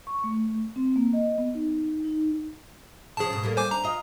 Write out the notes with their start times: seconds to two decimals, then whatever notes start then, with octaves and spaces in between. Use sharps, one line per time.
0.07 C#6
0.24 A3
0.76 C4
0.96 A#3
1.13 D#5
1.38 B3
1.55 D#4
2.05 D#4
3.17 C#3 F3 C#4 G#4 A5
3.30 G#2 B2
3.43 A2 G3 A#3
3.57 C5 G#5 D6
3.71 D4 A#5
3.84 F4 D#5